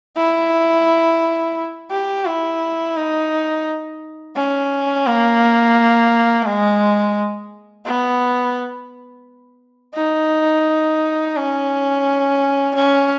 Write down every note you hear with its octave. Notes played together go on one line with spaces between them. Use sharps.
E4
G4
E4
D#4
C#4
A#3
G#3
B3
D#4
C#4
C#4